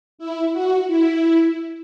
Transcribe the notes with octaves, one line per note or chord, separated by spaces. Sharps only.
E4
F#4
E4